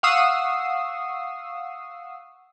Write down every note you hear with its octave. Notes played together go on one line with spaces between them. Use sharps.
F5 F#5 C#6 D#6 E6 C7